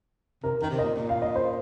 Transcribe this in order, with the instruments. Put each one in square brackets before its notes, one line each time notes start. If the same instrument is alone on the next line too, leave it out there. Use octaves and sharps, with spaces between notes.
[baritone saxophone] C3 [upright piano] A#4
[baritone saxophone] D#3 [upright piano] A#4
[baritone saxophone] C3
[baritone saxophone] A#2 [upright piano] D#5
[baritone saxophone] A#2
[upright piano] F5
D#5
C5